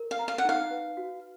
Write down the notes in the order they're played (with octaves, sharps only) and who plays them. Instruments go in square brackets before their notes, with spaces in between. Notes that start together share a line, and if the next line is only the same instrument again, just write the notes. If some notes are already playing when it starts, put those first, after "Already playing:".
Already playing: [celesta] A#4
[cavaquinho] F5
[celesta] A#5
[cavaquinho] F5
F#5
[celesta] D#4 [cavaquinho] F5
[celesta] B4
F#4